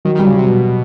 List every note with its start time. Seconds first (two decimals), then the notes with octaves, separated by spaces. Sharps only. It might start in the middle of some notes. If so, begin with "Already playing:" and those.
0.05 D#3 F#3
0.15 D#3 G3
0.26 C#3
0.34 C3 F#3
0.49 B2